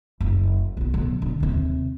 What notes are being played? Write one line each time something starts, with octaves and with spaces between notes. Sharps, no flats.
F#1
B1 C3
B2 F#3
D3
D#2 C3